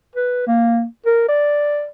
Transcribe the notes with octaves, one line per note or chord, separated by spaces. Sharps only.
B4
A#3
A#4
D5